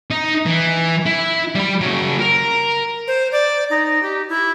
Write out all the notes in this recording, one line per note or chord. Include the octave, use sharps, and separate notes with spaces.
D#4
E3
E4
G3 B5
C#3 F#3
A#4
C5
D5
D#4
G4
E4